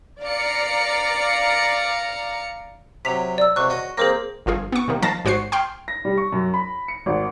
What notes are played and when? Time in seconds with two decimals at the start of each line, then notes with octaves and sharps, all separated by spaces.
0.22 D5 F5 A#5 C#7
3.05 C3 F#3 B6 F7
3.38 D5 E6
3.56 C#2 C3 C#6 F#6
3.70 F#4 D#5
3.97 A#3 C4 G#4 C5 A#6
4.46 G1 F3 F4 G#4
4.72 B3 C#6
4.88 C3 D#3 A#3
5.02 D#3 F3 F5 A5 A6 A#6
5.25 G#1 F#4 C5 C#6 C7
5.52 G5 C6 F6
5.88 A#6
6.05 G3
6.18 C#6
6.32 F#2
6.54 B5
6.88 C#7
7.06 G#1